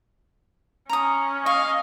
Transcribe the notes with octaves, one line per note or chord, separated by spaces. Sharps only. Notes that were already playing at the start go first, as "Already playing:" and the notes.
C#4 A#5 D#6
D#5 F5 C#6